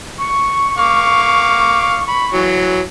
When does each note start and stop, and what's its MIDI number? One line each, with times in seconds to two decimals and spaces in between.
0.19 2.39 85
0.78 1.98 77
0.78 1.98 86
2.09 2.27 83
2.34 2.80 52
2.34 2.80 54